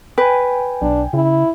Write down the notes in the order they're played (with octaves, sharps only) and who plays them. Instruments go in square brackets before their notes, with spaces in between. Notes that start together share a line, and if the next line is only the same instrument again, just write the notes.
[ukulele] B4 [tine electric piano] G5 G#5
[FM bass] B1 [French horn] D4
[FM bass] C#3 [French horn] E4